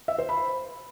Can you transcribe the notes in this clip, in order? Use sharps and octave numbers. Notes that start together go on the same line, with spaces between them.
E5
C5
B5